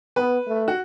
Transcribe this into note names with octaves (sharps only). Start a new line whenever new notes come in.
B3 B4
A3
F#4